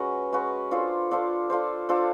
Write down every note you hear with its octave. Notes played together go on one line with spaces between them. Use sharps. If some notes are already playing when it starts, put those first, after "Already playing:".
Already playing: G#3 C#4 F#4 B4
G#3 C#4 F#4 B4
D4 F4 A4 C5
D4 F4 A4 C5
D4 F4 A4 C5
D4 F4 A4 C5